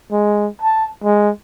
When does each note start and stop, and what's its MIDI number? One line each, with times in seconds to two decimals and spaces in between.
0.11 0.49 56
0.62 0.88 81
1.04 1.31 56